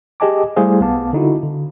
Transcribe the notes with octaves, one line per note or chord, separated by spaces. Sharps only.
G4 G#4 D#5 G#5 A5 D6
G3 A3 E4 G#4 C5 F5
B1 B3 F5 A5 D6
D3 D#4 E4 F#4
D3